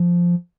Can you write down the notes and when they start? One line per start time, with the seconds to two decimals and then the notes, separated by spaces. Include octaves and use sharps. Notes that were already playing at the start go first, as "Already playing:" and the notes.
Already playing: F3